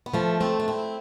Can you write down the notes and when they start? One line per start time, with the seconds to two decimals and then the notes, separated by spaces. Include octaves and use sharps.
0.06 B3
0.14 F3 A3
0.40 A3 C4
0.60 D4
0.68 C4 E4